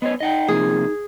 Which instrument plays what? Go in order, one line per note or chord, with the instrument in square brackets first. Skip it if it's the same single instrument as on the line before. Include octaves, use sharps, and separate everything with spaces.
[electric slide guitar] B3 C5 C#5 [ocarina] D#5
[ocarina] D#4 [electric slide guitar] D#5 F#5 G5
[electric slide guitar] C3 F3 A#3 [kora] G#4